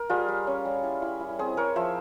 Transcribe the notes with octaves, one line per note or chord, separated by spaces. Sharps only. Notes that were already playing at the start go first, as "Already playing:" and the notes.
Already playing: A#4
G3 F4 G#4
G3
C#4
G3
E4
E4
E4
C4 G#4 C5
E4 A#4 C#5
F3 C5 E5